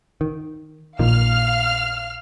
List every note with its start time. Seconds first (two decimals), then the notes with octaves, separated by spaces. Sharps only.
0.21 D#3
0.99 A#1 A#2 D#3 F5 F6